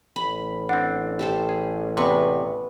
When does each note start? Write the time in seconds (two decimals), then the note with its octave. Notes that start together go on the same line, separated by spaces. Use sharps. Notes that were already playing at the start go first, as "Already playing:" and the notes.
0.16 A1 B5
0.69 C4 D4 F#5
1.19 G4 A4 C5
1.49 G#4
1.97 E2 C3 B3 C#6